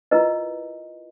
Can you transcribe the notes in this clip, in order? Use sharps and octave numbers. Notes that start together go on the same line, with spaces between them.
E4 F4 A#4 B4 D#5